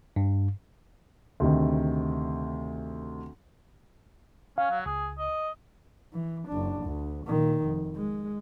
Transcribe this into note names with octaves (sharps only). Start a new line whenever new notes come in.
G2
D2 C3 D#3
C#4 F5
F#3
C#2 G#4
D#5
E3
F#1 D4
D2
A#2 D#3
F1
G#3